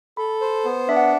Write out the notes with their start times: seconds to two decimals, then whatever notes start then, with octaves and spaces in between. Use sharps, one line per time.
0.17 A4 B5
0.41 C5
0.65 B3
0.88 D4 E5
0.97 F#5